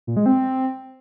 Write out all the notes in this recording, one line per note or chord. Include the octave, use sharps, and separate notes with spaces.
A#2
G#3
C4